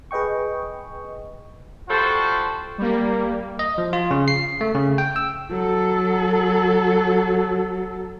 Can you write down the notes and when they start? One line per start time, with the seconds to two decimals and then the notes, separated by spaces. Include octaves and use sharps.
0.11 G#4 B4 D#5 G5 C#6
1.89 G3 F4 F#4 A4 C5
2.78 G3 A#3
3.59 D#5
3.78 F3
3.93 F4
4.11 C#3
4.28 C7
4.61 A3
4.75 C#3
4.98 G5
5.16 E6
5.51 F#3 A4